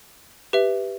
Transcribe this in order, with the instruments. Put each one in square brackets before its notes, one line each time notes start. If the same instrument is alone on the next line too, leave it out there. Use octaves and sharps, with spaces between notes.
[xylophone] G4 B4 E5